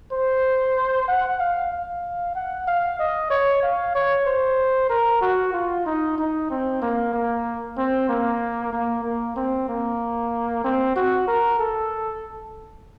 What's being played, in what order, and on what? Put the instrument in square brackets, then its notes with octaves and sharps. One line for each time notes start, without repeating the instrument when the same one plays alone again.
[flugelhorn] C5
F#5
F5
F5
F#5
F5
D#5
C#5
F5
C#5
C5
A#4
F#4
F4
D#4
D#4
C4
A#3
A#3
C4
A#3
A#3
A#3
C4
A#3
C4
F#4
A#4
A4